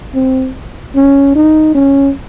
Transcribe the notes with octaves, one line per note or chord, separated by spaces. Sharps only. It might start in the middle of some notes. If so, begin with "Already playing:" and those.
C4
C#4
D#4
C#4